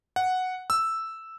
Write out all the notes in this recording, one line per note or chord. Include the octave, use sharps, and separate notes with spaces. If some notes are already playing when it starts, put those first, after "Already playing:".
F#5
E6